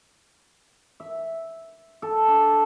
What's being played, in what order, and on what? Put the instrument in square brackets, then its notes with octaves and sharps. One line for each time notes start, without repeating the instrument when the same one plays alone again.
[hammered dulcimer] E5
A4
D4